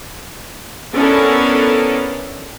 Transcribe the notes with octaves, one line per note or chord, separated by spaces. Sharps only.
B3 C#4 D4 E4 A4 A#4